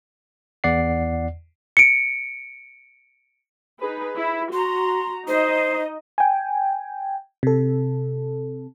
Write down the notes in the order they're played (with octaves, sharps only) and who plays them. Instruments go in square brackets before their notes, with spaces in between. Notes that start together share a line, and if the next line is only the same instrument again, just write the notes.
[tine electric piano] E2 D5 F#5 C7
[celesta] C#7 D7
[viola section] D#4 G#4 B4
E4
[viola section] F#4 A#5 [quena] C6
[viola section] D#4 D#5 [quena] C5
[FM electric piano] G5 G#5
C3 A4